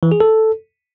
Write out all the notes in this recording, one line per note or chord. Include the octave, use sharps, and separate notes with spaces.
E3
G#4
A4